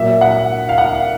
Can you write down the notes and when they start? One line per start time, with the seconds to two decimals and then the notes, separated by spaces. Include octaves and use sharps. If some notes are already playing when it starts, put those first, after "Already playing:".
Already playing: A#2 F#3 E5
0.21 F#5
0.69 F5
0.78 F#5